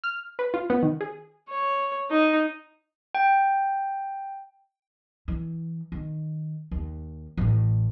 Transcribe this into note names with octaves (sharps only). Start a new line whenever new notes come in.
F6
B4
F4
B3
D#3
G#4
C#5
D#4
G5
E3
D#3
D#2
A1 A2